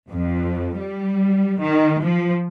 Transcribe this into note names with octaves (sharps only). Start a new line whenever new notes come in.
F2
G3
D#3
F3